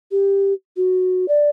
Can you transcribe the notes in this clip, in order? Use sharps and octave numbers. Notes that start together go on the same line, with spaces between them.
G4
F#4
D5